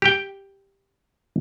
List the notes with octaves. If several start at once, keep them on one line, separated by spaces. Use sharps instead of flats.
G4 G5